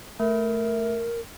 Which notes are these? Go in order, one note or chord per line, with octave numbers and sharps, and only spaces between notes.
A3 A#4